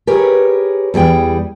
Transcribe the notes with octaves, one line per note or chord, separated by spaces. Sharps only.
G4 G#4 A#4 B4 C#5
E2 G3 G#4 G5